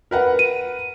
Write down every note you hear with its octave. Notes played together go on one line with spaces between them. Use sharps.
A#4 B4 F#5
D#7